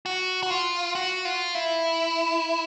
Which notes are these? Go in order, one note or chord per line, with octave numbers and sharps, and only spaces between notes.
F#4
F#4
F4
F#4
F4
E4